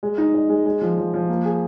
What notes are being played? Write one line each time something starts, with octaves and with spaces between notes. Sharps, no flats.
G#3
D#4
D#5
G#3
G#3
F3
F3
F3
A#3
G#4